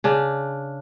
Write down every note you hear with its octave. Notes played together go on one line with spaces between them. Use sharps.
C#3 D4